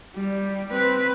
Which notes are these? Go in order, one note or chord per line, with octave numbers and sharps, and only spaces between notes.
G3
C4 B4